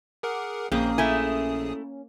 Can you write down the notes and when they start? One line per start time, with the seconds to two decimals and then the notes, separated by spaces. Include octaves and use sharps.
0.23 G#4 A#4 F#5 D6
0.72 A#1 F2 A#3 C4 C#4 G#4 D#6
0.98 A3 E4 G#5